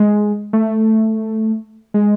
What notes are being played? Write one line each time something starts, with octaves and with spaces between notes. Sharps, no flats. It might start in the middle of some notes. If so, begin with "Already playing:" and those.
Already playing: G#3
A3
G#3